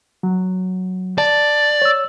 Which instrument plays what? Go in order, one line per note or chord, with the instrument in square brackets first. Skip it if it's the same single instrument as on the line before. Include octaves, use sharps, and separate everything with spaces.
[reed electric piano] F#3
[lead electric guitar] D5 [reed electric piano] A5
[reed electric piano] C#5 E6